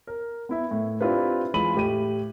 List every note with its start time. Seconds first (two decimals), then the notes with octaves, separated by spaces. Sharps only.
0.07 A#4
0.49 B3 E4 E5
0.71 A2
1.01 C4 D4 E4 F4 G4 B4
1.54 E3 G#3 F4 B5 D#7 F#7
1.74 A2 G4 D#7